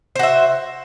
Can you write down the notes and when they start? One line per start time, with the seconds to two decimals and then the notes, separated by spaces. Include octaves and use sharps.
0.16 C5
0.19 F#4
0.23 E5